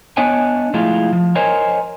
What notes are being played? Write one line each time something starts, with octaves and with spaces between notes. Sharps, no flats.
B3 D4 C#5 D#5 G#5
F3 G#3 A3 E4 F4
F3
A#4 C5 C#5 D#5 G#5 A#5